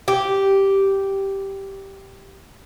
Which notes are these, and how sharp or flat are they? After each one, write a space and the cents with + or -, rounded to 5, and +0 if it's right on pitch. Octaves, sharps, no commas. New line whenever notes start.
G4 -5